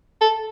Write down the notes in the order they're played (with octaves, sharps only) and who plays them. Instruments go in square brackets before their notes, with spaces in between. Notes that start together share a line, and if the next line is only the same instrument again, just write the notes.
[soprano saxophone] A4